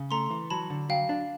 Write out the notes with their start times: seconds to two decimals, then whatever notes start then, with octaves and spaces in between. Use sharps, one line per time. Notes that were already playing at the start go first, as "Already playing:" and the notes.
Already playing: C#3
0.11 A3 A#5 C6
0.30 E3
0.50 F#3 A5 B5
0.70 D3
0.89 F#3 F5 G5
1.09 D4